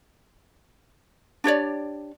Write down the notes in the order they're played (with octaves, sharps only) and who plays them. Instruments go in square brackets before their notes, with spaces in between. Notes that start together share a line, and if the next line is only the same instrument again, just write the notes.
[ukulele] D4 G4 C#5 D5